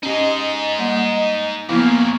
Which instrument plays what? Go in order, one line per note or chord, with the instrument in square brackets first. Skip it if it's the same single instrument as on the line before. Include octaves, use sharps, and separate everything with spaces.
[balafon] C#4 G4 [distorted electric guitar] D#4 G#4 [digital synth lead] D#5
[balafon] G3 A#3 F#5
[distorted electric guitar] F2 C#3 [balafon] F3 B3 E4 [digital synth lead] A#3